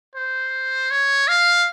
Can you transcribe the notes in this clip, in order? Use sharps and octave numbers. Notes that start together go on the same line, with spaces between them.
C5
C#5
F5